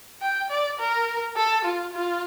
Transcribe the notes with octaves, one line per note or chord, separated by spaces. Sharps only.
G5
D5
A#4
A4
F4
F4